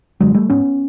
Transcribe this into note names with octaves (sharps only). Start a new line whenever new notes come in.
F#2 D3 F#3 G#3
G3 A3
G#2 B3 C#4